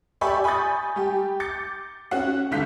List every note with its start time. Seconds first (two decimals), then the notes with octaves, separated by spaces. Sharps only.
0.21 G4 D5 E5 G#5 B5 C#6
0.44 G#5 B5 C#6 D#6 G6 A6
0.96 G3 G4
1.40 D6 G6 A6 C#7
2.11 C#4 F#4 F#5
2.51 G1 G#2 D3 F5 G6 B6